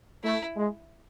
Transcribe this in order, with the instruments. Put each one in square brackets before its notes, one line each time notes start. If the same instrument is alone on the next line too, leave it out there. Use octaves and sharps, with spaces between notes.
[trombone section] A3 [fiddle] E4
[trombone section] G#3